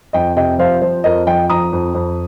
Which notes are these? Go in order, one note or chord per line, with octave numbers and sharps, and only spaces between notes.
F2 D#5 G5
C3 D#5 G5
F3 C5 F5
F3 C5
F2 A#4 D#5
F3 D#5 G5
F2 A#5 D#6
F2
F2